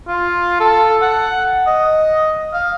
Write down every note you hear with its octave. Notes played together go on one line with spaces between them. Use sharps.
F4
A4
F#5
D#5
F5